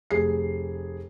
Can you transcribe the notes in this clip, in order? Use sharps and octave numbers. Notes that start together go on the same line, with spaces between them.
F1 G#4 C7